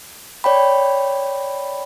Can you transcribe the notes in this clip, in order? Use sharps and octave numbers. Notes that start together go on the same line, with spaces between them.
C#5 D5 G5 B5